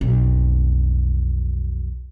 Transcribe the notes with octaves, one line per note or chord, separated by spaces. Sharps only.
B1 F2